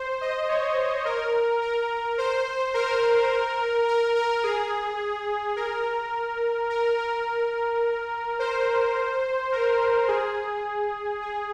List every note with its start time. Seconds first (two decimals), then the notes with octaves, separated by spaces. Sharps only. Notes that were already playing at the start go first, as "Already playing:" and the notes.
Already playing: C5
0.21 D#5
0.49 C#5
1.05 A#4
1.61 A#4
2.18 C5
2.74 A#4
3.88 A#4
4.16 A#4
4.44 G#4
5.56 A#4
6.70 A#4
6.98 A#4
8.39 C5
9.52 A#4
10.08 G#4
11.21 G#4